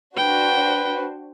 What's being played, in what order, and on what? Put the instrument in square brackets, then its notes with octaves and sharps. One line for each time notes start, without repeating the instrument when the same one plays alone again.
[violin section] D4 F#4 C5 [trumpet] B4 [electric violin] G5